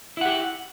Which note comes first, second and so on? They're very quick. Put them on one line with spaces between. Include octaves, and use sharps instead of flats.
E4 F#5 G4